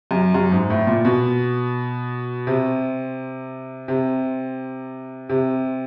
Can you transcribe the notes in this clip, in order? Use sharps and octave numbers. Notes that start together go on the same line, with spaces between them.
F#2
F#2
G#2
A2
A#2
B2
C3
C3
C3